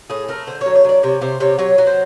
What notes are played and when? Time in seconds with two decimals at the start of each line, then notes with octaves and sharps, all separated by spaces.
0.10 A2 G#4
0.28 A3 A#4
0.47 D3 C5
0.61 C#5
0.66 F#3
0.75 C#5
0.84 F#3 D5
1.03 C3 C#5
1.21 C3 C5
1.40 C3 C#5
1.59 F#3 C#5
1.78 F#3
1.87 C5